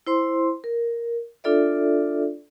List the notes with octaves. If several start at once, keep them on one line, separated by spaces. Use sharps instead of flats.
E4 C5 C6
A#4
D4 F4 A4 D5 E5